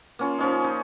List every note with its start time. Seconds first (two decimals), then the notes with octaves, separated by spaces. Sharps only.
0.19 A#3 C#4 F4
0.39 F3 C#4 D#4
0.64 D#4